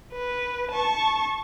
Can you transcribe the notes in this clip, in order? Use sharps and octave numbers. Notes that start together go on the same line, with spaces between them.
B4
A5 C#6